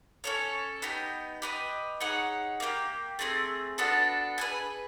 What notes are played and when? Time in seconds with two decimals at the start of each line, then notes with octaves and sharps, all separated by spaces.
0.24 C#4 F4 A4 C#5
0.82 B3 D#4 G4
1.42 G4 B4 D#5
2.00 D#4 G#4 C#5 F#5
2.60 A#3 D#4 G4
3.19 A3 C4 D#4 G#4
3.78 B3 D4 F#4 A4
4.38 G#4 B4 D#5 G#5